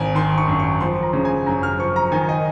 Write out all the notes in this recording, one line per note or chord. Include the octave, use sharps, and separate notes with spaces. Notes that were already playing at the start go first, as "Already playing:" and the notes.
Already playing: G#1 D#3 G#5
D#3 C6
C#6
F#2
C#6
F3 C6
A#5
C#3
G#5
F#2 A#5
F6
F3 C#6
A#5
D#3 G#5
D#5